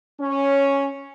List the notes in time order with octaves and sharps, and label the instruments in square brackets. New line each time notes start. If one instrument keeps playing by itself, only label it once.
[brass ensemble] C#4